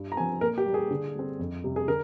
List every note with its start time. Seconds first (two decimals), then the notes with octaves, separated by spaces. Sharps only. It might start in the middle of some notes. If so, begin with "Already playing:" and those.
Already playing: G2
0.12 A#5
0.17 C4 G#5
0.20 F3
0.41 A#2 A#4
0.58 G4
0.66 G3 A#3
0.74 G#4
0.90 D3
1.15 G3 C4
1.39 F2
1.64 C3 G3
1.76 G#4
1.88 D3 A#4